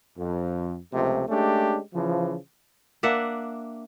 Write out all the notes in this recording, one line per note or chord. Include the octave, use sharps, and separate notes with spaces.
F2
C#2 C3 F3 G#3 A3
G#3 A3 C#4 D4 G4
C#3 E3 F3
A#3 D4 E5 F#5